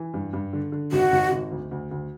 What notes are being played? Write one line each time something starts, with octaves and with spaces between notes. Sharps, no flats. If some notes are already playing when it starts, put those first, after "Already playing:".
Already playing: E3
G2
G2
D3
D3
G#1 F#4
G#1
G#1
D2
D2
D2